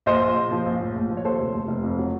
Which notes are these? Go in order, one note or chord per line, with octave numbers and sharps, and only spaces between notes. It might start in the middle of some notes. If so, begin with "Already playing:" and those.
A#1 C5 D#5
A#1
A#1
F3
A#1
A2
A#1
F3
C#5
D#2 A4 C5
F1
F1
F1
F2
F#3